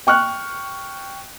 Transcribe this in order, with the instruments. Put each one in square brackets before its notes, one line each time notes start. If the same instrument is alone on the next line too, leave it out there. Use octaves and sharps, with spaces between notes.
[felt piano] G5 C#6 F6 F#6